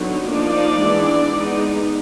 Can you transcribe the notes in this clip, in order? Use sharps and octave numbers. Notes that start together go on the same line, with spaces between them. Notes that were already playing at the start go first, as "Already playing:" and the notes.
Already playing: D3 F#3 B3 D#4
F3 A#3 D4 D#4 D5
E3 G#3 B3 D4
G#3 B3 D#4